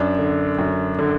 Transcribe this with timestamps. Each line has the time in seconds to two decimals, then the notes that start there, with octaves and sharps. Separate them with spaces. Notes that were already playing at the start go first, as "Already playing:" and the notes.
Already playing: F#2 D4
0.18 D3
0.58 F#2
0.99 D3